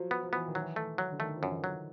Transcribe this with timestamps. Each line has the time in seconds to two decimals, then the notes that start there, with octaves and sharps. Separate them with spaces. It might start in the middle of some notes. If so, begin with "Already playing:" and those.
Already playing: F3 F#3
0.11 B3
0.22 F3
0.33 E3 B3
0.48 D#3
0.55 F#3
0.61 E3
0.76 A3
0.98 F#3
1.12 D3
1.20 D#3 A3
1.36 F3
1.43 F#2 E3
1.54 D#3
1.64 F#3